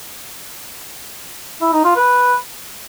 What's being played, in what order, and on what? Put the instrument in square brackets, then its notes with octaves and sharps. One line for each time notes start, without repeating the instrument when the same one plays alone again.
[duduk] E4
D#4
F4
B4